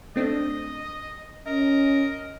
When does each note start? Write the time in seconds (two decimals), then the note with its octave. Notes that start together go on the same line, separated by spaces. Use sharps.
0.16 A3 C4 D4 D#5
1.47 C#4 A#4 D#5